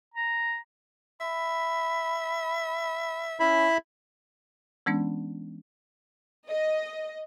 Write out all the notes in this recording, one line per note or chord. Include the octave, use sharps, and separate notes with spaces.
A#5
E5 B5
C#4 E4 E5 B5
E3 G#3 B3 C#4 D4
D#5